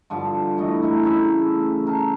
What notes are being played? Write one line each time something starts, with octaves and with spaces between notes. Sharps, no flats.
G2 D3 F3
E3 A3 D#5
A3 E4 A#4
C#3 C#4 E5 B5
A#4 A5